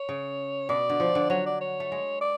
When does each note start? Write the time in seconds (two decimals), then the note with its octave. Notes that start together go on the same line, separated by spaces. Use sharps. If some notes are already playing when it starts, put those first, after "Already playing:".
Already playing: C#5
0.09 C#3
0.69 B2 D5
0.90 D3
1.00 F3
1.15 D3
1.30 F#3 C#5
1.46 D5
1.61 C#5
1.80 A3
1.92 G#3
2.21 D5